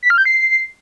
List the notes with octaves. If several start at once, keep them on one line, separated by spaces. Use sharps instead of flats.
B6
F6
G6
C7